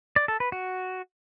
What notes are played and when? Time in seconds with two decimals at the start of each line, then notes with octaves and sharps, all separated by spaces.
0.16 D5
0.28 A4
0.40 B4
0.52 F#4